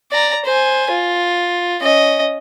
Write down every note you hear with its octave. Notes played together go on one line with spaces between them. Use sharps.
D5 A#5
C5 G#5
F4
C#4 D#5